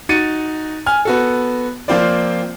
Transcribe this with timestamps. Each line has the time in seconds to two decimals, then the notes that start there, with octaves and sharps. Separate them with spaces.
0.09 D#4 F#4 A6 C#7 D#7
0.86 G#5 F6
1.05 B3 F#4 A4
1.88 F3 A#3 C4 F4 C5 D5